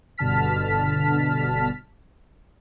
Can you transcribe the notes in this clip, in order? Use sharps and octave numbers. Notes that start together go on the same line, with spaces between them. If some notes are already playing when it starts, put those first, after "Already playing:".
G1 B2 D3 A5 F6 B6